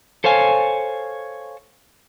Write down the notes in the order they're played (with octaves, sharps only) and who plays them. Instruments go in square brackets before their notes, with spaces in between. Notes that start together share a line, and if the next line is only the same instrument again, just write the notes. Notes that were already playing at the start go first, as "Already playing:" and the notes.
[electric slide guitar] A4 C5 C#5 F5 G#5